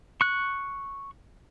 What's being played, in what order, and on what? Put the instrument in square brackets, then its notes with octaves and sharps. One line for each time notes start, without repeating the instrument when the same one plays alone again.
[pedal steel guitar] C#6 F#6